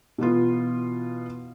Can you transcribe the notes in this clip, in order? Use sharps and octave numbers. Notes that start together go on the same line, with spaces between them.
B2 E3 B3 F4